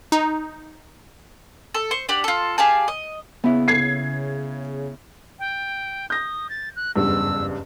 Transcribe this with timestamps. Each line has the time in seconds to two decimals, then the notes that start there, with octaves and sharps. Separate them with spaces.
0.12 D#4
1.74 A4
1.91 C5 C#6
2.09 D4 G4 F#5
2.24 F4 A4
2.58 G4 G#4 F5 A5
2.88 D#5
3.44 C#3 B3 E4
3.68 G#6 C7
5.39 G5
6.10 D#6 G6 A#6
6.50 A6
6.76 F#6
6.96 F#1 E2 G2 E6